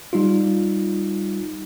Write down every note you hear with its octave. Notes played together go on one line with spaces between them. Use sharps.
G3 D#4 F4